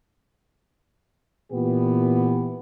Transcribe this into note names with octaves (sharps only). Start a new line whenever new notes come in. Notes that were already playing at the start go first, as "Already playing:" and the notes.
A#2 E3 B3 G4